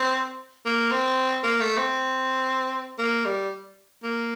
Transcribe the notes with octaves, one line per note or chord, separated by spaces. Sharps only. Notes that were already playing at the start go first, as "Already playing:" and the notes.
Already playing: C4
A#3
C4
A#3
A3
C4
A#3
G3
A#3